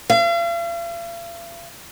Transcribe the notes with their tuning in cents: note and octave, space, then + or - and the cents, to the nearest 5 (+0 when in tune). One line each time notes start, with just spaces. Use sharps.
F5 -45